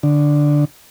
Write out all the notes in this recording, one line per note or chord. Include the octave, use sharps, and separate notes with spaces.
D3